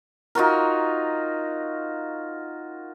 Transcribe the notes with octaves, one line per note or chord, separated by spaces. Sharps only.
D#4 F4 F#4 A#4